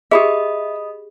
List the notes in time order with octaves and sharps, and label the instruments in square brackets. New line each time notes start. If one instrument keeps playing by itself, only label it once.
[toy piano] G4 G#4 [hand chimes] D#5 B5 D#6 [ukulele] E5